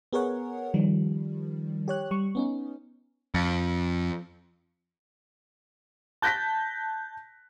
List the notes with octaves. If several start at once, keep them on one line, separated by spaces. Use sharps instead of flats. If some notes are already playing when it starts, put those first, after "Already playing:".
B3 G#4 A#4 C#5 F#5
D#3 F3 G3
G4 C#5 F#6
G3 C#6
B3 C#4 D#4
F2
A5 F#6 G6 A#6 B6